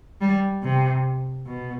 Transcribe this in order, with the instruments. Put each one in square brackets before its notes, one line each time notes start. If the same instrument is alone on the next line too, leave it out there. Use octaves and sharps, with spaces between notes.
[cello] G3
C3
B2